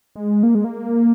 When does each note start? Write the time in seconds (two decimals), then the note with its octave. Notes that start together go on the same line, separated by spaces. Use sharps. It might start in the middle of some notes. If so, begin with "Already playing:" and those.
0.16 G#3
0.43 A#3
0.55 G#3
0.64 A#3